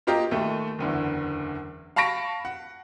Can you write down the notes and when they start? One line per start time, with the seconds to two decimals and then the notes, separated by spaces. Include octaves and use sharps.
0.07 A#3 F4 G4 A#4 D#5
0.31 D#2 A3
0.79 F#1 E2 D3
1.96 F5 A5 B5 C#6 A#6 D7
2.45 F#5